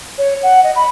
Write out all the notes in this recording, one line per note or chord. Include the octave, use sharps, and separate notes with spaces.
C#5
F#5
D#5
B5